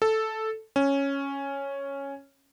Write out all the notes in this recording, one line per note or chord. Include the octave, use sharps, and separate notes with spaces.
A4
C#4